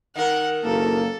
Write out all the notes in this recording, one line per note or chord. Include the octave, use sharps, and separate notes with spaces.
D#3 A#4 F#5
F#1 A#3 A4